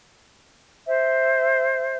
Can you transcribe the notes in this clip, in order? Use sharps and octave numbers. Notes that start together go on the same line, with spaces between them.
C5 E5